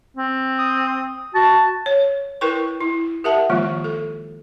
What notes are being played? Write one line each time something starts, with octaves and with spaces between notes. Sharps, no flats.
C4
D#6
F#4 A5
C#5
E4 A#4 B4 G5 C#6
E4
G4 A#4 E5 F#5 A5
D#3 F3 G#3 A#3 F4
A4